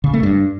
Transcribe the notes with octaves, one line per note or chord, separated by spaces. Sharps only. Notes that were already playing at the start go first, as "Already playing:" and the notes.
C#3
A3
G2